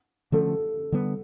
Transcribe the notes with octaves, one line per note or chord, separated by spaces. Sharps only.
D3 F3 A3 C#4 A4
D3 G3 B3